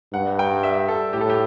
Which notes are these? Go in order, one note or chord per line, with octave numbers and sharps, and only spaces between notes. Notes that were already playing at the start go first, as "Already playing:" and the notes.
G2 F#5
G5
E5
A4
A2 G4
A4
G4